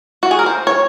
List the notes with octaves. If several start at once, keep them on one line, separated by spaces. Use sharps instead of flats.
F#4
G#4
A#4
C5
C#5